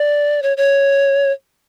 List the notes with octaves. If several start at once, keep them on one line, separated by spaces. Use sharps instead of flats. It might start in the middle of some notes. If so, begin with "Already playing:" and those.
Already playing: D5
C#5
C#5